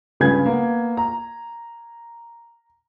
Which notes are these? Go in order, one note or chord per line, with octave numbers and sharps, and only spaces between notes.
C#2 G2 C#3 B4 G#5 G#6
A#3 B3
A#5